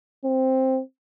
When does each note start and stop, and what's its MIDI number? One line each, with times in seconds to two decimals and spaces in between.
0.25 0.80 60